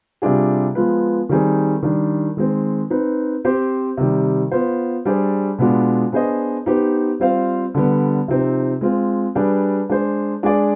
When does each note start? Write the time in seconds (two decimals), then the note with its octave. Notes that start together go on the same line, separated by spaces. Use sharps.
0.22 C3 G3 D4 F4 G#4
0.75 F3 G#3 B3 F4 B4
1.29 D#3 G3 C4 D#4 G#4
1.83 D#3 G3 D4
2.37 D#3 G#3 C4
2.90 C4 D#4 B4
3.45 C4 G4 C5
3.97 C3 D#3 G3
4.51 B3 F4 C5
5.05 G3 D4 G#4 C5
5.59 B2 G#3 B3 D4 F4
6.12 B3 D4 G#4 C5 D#5
6.66 B3 D#4 G4 C5
7.20 G3 C4 F4 C5 F5
7.74 D3 G3 B3
8.28 C3 F3 C4 D#4
8.81 G#3 C4 F4
9.35 G3 D4 G#4 B4
9.90 G#3 D4 G#4 C5
10.43 G#3 D4 G#4 D5